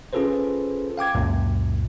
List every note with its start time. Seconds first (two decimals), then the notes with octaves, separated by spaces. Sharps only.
0.13 C#4 F4 G#4 A4 B4 C5
0.98 F5 G5 D6 G#6
1.15 C#2 F#2 A#2